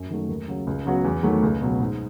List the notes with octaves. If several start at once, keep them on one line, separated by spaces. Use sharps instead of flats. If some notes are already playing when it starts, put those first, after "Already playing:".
Already playing: F#2
D#3 F#3 A3
D#2
C#3 F#3
C#2
C#3 F#3 B3 F#4
E2
D#3 F#3 A3
C#2
B2 F#3
G#2